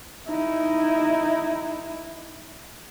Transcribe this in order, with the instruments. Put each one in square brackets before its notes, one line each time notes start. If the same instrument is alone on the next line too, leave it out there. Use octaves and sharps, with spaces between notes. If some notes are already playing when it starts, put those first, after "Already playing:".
[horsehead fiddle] D#4 E4